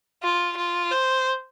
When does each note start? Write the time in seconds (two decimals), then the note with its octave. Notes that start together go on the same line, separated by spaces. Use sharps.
0.23 F4
0.57 F4
0.91 C5